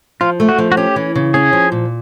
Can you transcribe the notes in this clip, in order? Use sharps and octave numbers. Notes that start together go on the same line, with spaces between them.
F3 F4
A3
F#4
F3
F#4
C#4 G4
E3
C#3
C#4 G#4
F3
A#2